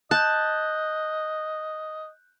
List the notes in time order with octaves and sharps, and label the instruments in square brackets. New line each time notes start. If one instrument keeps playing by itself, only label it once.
[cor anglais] D#5 [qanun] A5 [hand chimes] F#6 G6